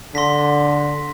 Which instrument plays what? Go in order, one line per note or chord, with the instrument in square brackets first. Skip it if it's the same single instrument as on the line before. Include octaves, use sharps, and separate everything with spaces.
[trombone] D3 [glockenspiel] C6 A#6 B6